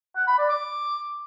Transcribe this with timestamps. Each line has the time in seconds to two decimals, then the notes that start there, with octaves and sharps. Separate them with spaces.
0.16 F#5
0.27 B5
0.38 D5
0.49 D6